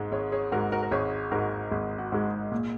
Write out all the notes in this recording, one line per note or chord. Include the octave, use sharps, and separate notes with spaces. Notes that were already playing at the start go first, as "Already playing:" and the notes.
Already playing: G#1 G#2 G#3
G#1 G#4 C#5
G#4 C#5
G#2 G#3 F#4 A#4
F#4 A#4
A#4
G#1 G#4 C#5
G#2 G#3 F#4 A#4
G#1 G#4
F#4
G#2 G#3
G#4
A#2